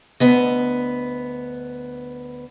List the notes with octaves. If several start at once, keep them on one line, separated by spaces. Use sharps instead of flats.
D2 B3 D#5